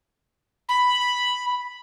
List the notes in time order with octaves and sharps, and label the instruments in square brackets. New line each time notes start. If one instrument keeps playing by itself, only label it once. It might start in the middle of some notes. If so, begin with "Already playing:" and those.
[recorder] B5